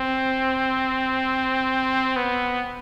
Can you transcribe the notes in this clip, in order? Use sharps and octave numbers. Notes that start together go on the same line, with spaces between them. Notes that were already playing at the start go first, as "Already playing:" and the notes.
Already playing: C4
B3